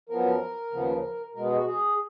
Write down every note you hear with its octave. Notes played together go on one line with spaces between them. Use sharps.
F#2 F3 B3 A#4
D#2 C#3 F3 B3
B2 G#3 B3 A#4
G#4
F#4
G#4